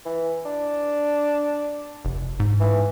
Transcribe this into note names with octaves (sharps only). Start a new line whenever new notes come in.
E3
D4
F1
G#2
E3